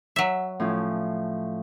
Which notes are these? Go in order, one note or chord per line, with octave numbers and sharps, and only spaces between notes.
F#3 E5
A2 F3 C#4